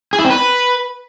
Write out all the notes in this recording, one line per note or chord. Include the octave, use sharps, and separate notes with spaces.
G#4
E4
C4
B4